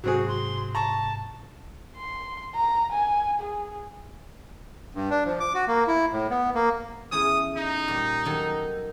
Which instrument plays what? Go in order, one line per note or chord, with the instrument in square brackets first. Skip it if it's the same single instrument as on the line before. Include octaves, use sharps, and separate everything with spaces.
[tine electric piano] G#2 C3 [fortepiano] F#3 C4 G#4 [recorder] F#4
[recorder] C6
[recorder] A5 [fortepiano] A#5 C#6
[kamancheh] C6
A#5
G#5
G#4
[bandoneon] G2
D4
F3
D6
F#4
A#3
E4
A2
B3
A#3
[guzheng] E2 A3 C#4 [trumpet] D#6
[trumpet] D#4
[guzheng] A#2 G3
D#3 F#3 A4